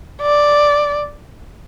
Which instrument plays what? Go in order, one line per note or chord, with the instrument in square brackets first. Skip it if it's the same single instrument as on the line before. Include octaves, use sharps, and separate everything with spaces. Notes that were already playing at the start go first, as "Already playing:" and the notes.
[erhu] D5